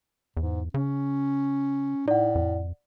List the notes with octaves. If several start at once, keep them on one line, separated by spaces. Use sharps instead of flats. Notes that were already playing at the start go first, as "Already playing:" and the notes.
E2 G#2
C#3 C#4
A2 D#4 D5 F#5
F2